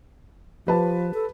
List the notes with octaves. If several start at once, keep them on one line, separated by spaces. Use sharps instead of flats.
F3 G4 B4 A5
A4